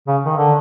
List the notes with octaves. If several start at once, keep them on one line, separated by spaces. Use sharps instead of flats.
C#3
D#3
D3